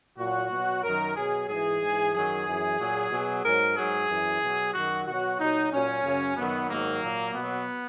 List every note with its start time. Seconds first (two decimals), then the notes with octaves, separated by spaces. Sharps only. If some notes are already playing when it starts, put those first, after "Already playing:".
0.18 A#2 F#3 F#4
0.51 B2 F#3
0.83 F#2 D#3 F#3 A#4
1.16 B2 F#3 G#4
1.49 G#2 E3 G#4
1.81 G#2 E3
2.14 F#2 D#3 F#3 G#4
2.47 F#2 E3
2.79 A#2 F#3
3.11 B2 F#3
3.44 G#2 F#3 A#4
3.77 G#2 F#3 G#4
4.09 F#2 E3
4.42 B2 F#3
4.74 F#2 D#3 F#3 F#4
5.07 B2 F#3 F#4
5.39 A#2 F#3 D#4
5.72 A#2 F#3 C#4
6.04 F#2 C#3 F#3
6.37 F#2 D#3 F#3 B3
6.70 G#2 D#3 F#3 A#3
7.02 A#2 F#3
7.35 B2 F#3 B3